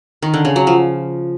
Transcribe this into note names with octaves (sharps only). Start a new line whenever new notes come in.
D#3
D3
C#3
F#3
F3